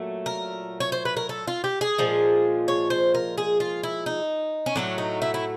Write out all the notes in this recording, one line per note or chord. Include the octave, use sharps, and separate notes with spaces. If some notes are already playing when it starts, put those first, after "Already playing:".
Already playing: A#2 F#3 A3
A#4
C#5
C5
B4
A#4
A4
F4
G4
G#4
A#2 F3 G#3
C#5
C5
A#4
G#4
F4
E4
D#4
C#4
A2 F#3 A3 D4
D#4
E4
E4